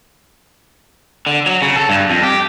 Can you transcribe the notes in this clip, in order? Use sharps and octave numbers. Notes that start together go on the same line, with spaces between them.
D3
F#3
C#3
A4
G2
F2
G4